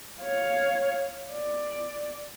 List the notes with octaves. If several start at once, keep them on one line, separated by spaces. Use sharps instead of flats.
C#5 F5
D5